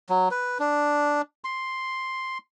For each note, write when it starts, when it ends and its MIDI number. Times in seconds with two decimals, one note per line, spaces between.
0.09 0.29 54
0.31 0.58 71
0.59 1.22 62
1.44 2.38 84